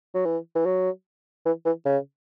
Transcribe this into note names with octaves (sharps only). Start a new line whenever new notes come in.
F#3
E3
E3
F#3
E3
E3
C#3